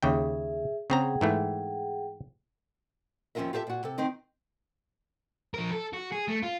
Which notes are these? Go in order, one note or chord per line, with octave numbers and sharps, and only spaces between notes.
D#2 C#3 G#4 E5 G5
C#3 C4 G#4 F#5 G5 A#5
G#2 E3 A3
D#2 F3 C#4 F4 A#4 E5
F4 G4 A4 B4 E5
A#2 F#4
C3 A4
D#3 C4 D#4
F3 A#4
A4
F#4
G#4
A3
F4